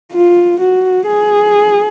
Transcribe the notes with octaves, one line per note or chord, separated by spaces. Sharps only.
F4
F#4
G#4